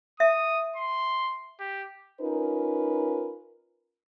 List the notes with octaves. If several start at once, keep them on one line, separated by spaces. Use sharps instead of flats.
E5 D#6
C6
G4
C#4 D#4 F4 A#4 B4